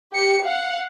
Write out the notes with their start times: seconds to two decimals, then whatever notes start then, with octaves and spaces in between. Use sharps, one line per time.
0.13 G4 C#7
0.44 F5 F#5